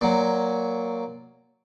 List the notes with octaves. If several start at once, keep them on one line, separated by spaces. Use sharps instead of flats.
A#2 F#3